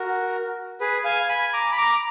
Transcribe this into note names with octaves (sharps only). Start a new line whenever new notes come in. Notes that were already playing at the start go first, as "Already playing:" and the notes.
Already playing: F#4 A#4
G#4 B4
F5 G#5
G#5 B5
A#5 D6
B5
A#5 D6